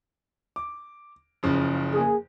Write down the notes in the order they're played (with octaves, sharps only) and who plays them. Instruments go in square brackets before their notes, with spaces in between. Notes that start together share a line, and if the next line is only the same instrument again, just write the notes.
[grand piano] D6
F#1 C#3 F3
[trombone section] A#3 G#4